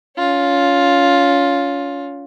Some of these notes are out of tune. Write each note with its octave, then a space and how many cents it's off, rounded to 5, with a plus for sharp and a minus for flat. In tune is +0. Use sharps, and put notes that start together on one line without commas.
C#4 +30 F4 +10